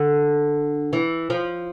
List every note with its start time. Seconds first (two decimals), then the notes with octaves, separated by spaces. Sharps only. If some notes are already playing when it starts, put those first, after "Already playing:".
Already playing: D3
0.93 E3
1.30 F3